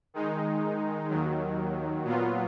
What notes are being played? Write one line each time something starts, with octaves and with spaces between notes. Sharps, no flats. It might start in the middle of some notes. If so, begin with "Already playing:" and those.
D#3 G#3 D#4
D#2 D#3 F#3
A#2 F#3 B3 F4